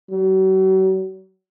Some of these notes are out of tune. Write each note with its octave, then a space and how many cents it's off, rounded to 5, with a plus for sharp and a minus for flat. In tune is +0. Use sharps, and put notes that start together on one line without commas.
F#3 +40